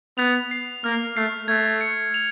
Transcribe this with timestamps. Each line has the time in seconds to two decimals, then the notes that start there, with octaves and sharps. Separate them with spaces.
0.18 B3 F7
0.51 C7
0.84 A#3 F6
1.16 A3 C7
1.48 A3 G#6
1.81 C#7
2.14 F7